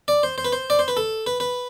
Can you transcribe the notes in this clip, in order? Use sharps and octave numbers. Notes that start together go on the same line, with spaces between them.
D5
C5
C5
B4
C5
D5
C5
B4
A4
B4
B4